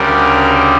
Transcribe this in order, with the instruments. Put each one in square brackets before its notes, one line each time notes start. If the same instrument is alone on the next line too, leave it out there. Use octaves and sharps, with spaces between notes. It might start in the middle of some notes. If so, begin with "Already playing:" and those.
Already playing: [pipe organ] D2 C#3 G3 A#4